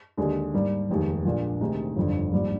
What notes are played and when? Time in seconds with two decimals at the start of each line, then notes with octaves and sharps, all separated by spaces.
0.17 D#2 D3 G#3
0.54 G#2 G3 A#3
0.90 F1 D#2 D#3 G#3
1.25 A#1 A#2 G#3 D4
1.60 D2 C3 D#3 G#3 D#4
1.96 G1 F2 D3
2.32 A#1 G#2 G3